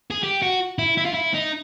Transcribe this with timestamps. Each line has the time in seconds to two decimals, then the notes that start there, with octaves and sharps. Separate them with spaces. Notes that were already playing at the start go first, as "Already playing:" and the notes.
0.10 G#4
0.23 G4
0.42 F#4
0.79 E4
0.98 E4
1.06 F4
1.14 E4
1.35 D#4